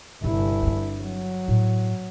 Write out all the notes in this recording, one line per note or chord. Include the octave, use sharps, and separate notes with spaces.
G1 C3 E4
C4 D4
F#3
A2